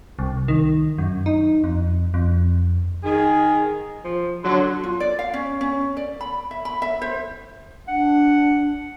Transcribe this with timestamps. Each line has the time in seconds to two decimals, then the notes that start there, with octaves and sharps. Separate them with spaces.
0.19 C2
0.48 D#3
0.98 F#2
1.26 D#4
1.64 F2
2.14 F2
3.04 D#3 G#4
4.05 F3
4.44 D3 F#3 C6
4.84 F4
5.00 D5
5.19 F5
5.34 C#4
5.61 C#4
5.97 D5
6.21 B5
6.51 E5
6.65 B5
6.82 E5
7.02 C5
7.88 D4 F#5